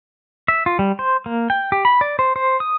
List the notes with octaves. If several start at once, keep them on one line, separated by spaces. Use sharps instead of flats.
E5
F4
G3
C5
A#3
G5
G4
B5
D5
C5
C5
D#6